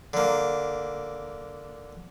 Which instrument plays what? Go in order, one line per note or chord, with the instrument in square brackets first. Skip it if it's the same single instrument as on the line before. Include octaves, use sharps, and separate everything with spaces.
[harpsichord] D3 A#3